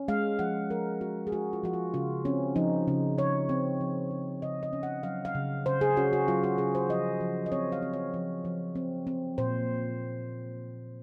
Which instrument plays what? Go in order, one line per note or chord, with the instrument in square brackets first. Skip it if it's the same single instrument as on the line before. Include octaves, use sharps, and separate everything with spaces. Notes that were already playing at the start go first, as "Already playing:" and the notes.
Already playing: [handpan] C#4
G#3 F5
F3 F#5
F3 A#4
C#4 F#4
G#4
G#3 F#4
F4
F3 F#4
F4
C#3 F4
C4 C#4
F3 D#4
C#3
C#3 C#5
C4
F3
C#3
C#3 D#5
D#5
C#4
F#5
F#3 F5
F5
C#3
C#3 C5
G#4
C#4 F#4
F#4
F#3 F4
F#4
C#3 G#4
C5
F3 D#5
F3
D#5
C4 C#5
F5
C4
C#5
F3
F3
C4
C4
A#2 C5